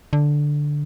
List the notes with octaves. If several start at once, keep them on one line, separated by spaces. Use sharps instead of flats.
D3